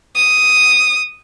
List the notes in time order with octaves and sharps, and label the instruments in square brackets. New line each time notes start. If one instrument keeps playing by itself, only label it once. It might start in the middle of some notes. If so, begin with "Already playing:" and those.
[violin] D#6